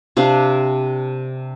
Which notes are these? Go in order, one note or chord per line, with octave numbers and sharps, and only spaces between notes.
C3 D4 F5